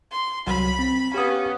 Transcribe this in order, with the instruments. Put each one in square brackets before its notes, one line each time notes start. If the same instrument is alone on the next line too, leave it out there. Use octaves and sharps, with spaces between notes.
[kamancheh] C6
[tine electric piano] C2 F#3 [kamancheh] B5
[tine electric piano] C4
[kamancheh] B3 C#4 [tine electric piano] G4 F5 D#6